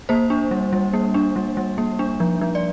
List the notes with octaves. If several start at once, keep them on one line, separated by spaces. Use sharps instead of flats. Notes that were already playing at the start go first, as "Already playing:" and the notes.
A#3 C5
D4
G3
G3
A#3
D4
G3
G3
A#3
D4
F3
F3
D5